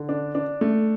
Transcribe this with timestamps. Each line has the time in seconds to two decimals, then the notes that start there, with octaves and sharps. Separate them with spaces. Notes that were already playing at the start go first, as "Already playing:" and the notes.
Already playing: D3
0.09 D4
0.35 D4
0.61 A3